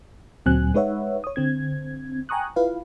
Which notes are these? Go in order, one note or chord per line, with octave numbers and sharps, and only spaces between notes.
D2 A#2 F#3 C4 G#5 F#6
G#3 D#4 B4 C#5 E5 F#5
C#5 D#6
D3 C4 G#6
G5 G#5 A#5 C#6 D#6 F#6
E4 F4 B4 F5